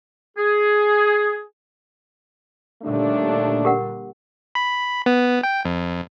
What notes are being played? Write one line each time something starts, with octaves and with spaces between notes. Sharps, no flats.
G#4
D#2 A#2 D3 G3 A3 D4
G4 A#4 F#5
B5
B3
G5
F2